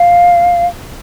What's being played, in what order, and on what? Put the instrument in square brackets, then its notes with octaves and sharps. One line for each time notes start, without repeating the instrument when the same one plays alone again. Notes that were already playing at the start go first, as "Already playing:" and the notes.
Already playing: [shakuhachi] F5